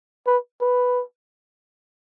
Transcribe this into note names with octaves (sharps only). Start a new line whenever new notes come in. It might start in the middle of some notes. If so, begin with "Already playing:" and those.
B4
B4